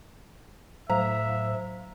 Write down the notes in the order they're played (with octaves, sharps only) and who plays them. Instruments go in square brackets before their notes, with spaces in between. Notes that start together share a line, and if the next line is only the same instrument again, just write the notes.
[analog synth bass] A2 [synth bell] F#3 C5 F5 [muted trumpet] E5 [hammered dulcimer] A#5